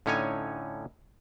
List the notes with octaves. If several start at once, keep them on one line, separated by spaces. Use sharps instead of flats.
A2 D3 C#4 D#4 C#5 G#5